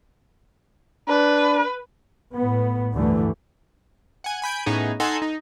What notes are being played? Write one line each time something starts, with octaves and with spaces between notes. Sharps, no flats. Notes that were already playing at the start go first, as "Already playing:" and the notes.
D4 B4
A2 B3
D2 G2 D3 E3 A3
F#5 G#5
G#5 B5 G6 D7
A2 B3 C#4 D#4 G#4
D#4 A4 F#5 G#5 C6
D#4